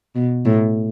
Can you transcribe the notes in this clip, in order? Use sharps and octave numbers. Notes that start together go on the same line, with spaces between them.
B2
A2